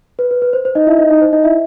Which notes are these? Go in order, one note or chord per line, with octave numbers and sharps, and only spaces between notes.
B4
B4
B4
C5
C5
D#4 D#5
E4 E5
D#4 D#5
D#4 D#5
C5
D#4 D#5
E4 E5